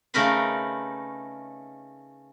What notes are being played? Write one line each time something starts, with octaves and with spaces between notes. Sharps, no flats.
C#3 A3 D#4 A#4 B4 C6